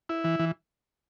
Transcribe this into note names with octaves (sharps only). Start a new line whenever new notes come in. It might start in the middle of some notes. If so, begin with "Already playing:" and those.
E4
E3
E3